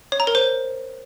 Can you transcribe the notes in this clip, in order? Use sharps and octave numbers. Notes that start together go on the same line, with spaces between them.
C#5
A#5
A#4
C5